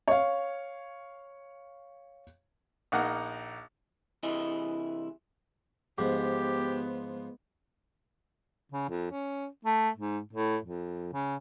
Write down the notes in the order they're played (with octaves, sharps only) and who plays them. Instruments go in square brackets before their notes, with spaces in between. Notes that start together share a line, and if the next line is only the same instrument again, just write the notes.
[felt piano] C#5 F5
[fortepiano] A#1 A#3 D#4 F#5 A#5
[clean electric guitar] C2 C3 E3 E4 G#4 D#5
[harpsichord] G#2 F3 [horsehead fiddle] B3 [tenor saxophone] G4
[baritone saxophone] C#3
F2
C#4
A3
G#2
A2
F2
C#3